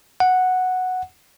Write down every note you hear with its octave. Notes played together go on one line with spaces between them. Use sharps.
F#5